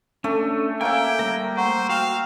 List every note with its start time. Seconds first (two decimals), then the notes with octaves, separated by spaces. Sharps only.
0.24 A3 C#4 D4
0.81 A#3 C#4 E5 G5 G#5 D7
1.19 G3 A3 A#4
1.57 C5 F#5 A#5 C#6
1.89 F#4 F5 G5 C#6 E7